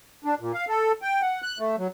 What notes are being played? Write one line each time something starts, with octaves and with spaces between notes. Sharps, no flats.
D4
A#2
F5
A4
G5
F#5
F#6
A3
F#3